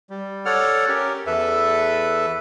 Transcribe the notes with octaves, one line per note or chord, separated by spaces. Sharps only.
G3
A4 C#5 D5 F#5 F6
C#4 G4 A#4
E2 A4 B4 E5